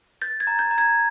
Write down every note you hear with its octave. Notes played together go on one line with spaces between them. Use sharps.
G6 A6
G#6
A#5
G6
A#5
G#6